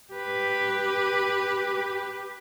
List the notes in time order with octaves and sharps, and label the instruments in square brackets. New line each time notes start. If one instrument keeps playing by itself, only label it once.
[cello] G4 B4